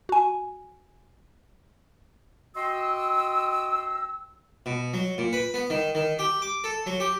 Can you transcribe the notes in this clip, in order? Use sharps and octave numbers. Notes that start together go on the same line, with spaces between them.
F#4 G#5
F#4 D#5 G5 C6 E6
B2
F#3
A#2
B4
B3
D#3
D#3
G4
D6
A4
F#3
G4